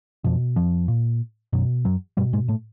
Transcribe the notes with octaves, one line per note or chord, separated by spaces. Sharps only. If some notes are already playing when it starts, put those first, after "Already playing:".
F2 B2 F3
F2 F3
A#2
F#2 B2 F#3
F#2 F#3
G2 B2 G3
G#2 G#3
A2 A3